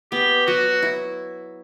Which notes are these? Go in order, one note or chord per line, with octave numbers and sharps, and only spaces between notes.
B3 G4
F#3 F#4
E4